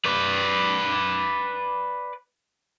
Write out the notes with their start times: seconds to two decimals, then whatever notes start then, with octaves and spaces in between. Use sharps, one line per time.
0.05 B4 D5